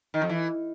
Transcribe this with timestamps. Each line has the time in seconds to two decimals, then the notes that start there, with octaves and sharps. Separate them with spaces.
0.14 D#3
0.22 F2
0.29 E3